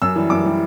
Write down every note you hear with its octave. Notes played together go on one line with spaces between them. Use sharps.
F#2 E6
E3 G3
F#2 D6
E3 G3